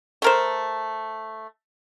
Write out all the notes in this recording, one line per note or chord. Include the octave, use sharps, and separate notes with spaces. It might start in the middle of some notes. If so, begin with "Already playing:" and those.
A3 A#4 C5